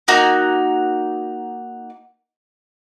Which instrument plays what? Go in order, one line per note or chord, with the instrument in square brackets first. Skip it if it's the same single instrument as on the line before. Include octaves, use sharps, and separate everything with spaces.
[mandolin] A#3 D#4 F#4